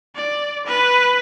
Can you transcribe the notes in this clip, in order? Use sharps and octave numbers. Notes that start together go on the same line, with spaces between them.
D5
B4